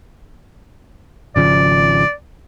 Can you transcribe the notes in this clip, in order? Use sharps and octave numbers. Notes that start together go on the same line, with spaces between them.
G#1 C#3 F3 D5